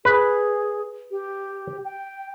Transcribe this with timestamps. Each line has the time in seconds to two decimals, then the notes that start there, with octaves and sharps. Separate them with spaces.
0.05 G#4 B4
1.11 G4
1.84 G5